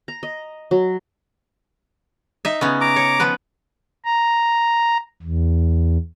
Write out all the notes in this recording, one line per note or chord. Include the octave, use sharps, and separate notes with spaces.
A#5
D#5
F#3
D#4 E5
C#3 B3 C#4
A#5 D6
C#5
F3 B3 B4
A#5
E2